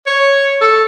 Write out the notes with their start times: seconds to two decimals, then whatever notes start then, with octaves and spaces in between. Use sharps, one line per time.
0.07 C#5
0.61 A4